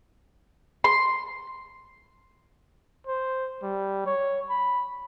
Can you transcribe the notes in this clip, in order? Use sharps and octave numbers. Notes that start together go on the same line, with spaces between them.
C6
C5
G3
C#5
B5